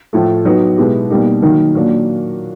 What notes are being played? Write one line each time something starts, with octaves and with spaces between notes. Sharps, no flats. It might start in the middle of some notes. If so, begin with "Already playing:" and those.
A2 F3 A3
F#3 B3 D#4
B2 G#3 B3 E4 G4
B2 G3 A#3 D#4 G4
D#3 F#3 A#3 D#4
A#2 F#3 A#3 D4